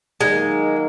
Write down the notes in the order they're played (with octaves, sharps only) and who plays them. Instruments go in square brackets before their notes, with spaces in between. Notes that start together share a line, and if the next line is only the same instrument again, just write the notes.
[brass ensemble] D#3 F#3 A#3 D#4 [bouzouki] G#3